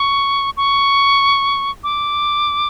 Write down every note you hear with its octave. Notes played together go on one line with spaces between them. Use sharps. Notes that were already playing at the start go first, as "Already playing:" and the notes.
Already playing: C#6
C#6
D6